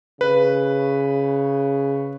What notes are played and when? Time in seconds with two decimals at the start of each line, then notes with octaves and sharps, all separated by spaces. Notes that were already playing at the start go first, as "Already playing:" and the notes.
0.21 C#3 B4